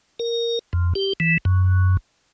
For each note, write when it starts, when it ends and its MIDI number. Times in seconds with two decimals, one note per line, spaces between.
0.19 0.59 70
0.73 0.93 41
0.95 1.13 67
1.20 1.37 52
1.45 1.97 42